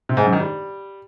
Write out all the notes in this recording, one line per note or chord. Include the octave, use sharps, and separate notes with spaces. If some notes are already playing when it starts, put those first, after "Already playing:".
C3
G#2
F#2
D#3
G3